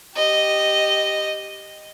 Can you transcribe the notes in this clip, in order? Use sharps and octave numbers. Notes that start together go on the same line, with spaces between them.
G4 D#5